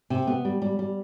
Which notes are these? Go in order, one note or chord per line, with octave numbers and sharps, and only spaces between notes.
C3
B3
G3
G3
G3